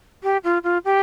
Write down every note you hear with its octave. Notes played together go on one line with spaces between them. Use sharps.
G4
F4
F4
G4